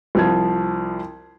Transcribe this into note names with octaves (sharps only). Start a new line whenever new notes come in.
C2 F3 G#6